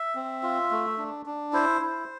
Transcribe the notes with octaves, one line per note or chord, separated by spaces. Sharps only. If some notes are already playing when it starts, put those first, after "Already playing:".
Already playing: E5
C4
F4
A3
D4
D4
E4 C5
E4